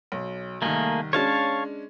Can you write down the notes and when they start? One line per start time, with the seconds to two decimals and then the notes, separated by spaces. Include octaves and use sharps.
0.12 B1
0.62 C2 D#3 A3 A#3 G#4
1.13 G#3 C#4 D4 C#5 F5 A5